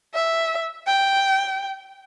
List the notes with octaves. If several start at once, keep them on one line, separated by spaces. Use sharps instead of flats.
E5
G5